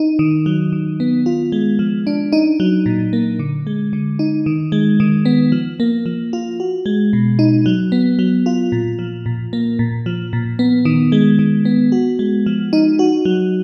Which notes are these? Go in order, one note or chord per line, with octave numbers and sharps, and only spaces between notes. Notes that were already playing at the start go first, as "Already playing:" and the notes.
Already playing: D#4
D#3
F#3
D#3
B3
F4
G#3
F3
D4
D#4
F#3
A#2
A#3
D3
G#3
D3
D#4
D#3
G#3
D#3
B3
F3
A#3
F3
F4
F#4
G#3
B2
D#4
F#3
B3
F#3
F4
A#2
F3
A#2
A#3
A#2
F3
A#2
B3
D#3
G#3
D#3
B3
F#4
G#3
F3
D#4
F#4
F#3